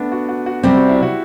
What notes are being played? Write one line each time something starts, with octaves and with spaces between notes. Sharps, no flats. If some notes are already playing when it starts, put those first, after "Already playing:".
Already playing: A3 B3 D4
F#4
F#4
F#4
C3 G3 C4 G4
F#4
E4
F#4